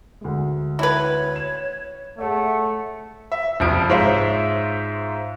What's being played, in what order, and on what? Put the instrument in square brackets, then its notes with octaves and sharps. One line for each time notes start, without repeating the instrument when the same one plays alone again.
[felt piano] D2 G#3
[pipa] E4 B4 [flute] C#5
[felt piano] E7
[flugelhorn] A3 [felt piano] G#4 C#5 E5 [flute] F#5
[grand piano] E5
F#1 C2 F2 F3 D7
G#2 F4 C5 C#5 E5